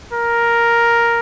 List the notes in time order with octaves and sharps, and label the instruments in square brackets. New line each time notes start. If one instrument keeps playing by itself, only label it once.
[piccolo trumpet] A#4